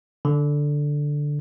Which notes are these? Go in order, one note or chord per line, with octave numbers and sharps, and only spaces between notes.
D3